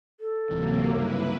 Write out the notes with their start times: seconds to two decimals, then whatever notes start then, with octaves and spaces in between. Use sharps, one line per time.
0.20 A4
0.51 D1 C3 E3 F#3 A#3
0.94 C#2 G2 C#3 E4 B4